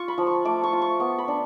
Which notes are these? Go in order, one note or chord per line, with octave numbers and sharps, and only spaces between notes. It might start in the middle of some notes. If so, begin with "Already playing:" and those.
Already playing: F4 C#6
B5
F3
C#6
A3 D6
C#6
F4
C#6
B3 C#6
B5
D4